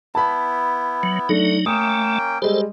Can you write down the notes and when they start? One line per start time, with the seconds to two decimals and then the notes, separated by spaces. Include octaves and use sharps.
0.15 B3 E4 A5 B5
1.03 F#3
1.29 F#3 A3 D4 D#4
1.66 A3 A#3 C#4 G5 D#6
2.42 G3 G#3 A4 C5